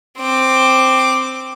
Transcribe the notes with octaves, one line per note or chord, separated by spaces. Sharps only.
C4 D6